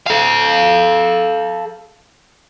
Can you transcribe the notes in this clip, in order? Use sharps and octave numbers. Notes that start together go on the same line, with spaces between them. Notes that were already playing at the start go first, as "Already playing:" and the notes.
A4 F5